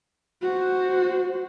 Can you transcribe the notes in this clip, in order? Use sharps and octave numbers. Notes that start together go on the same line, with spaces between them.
F#4 C5